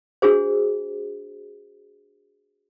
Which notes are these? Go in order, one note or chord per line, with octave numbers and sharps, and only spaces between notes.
D4 F#4 G#4 C5